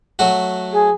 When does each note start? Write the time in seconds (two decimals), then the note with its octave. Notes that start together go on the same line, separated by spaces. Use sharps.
0.19 F#3 A3 F#4
0.72 G#4